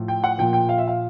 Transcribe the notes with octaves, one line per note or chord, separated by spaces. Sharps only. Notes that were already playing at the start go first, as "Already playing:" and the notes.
Already playing: A2 F3
G5
F#5
A#2 F3 G5
G5
F5
E5
F5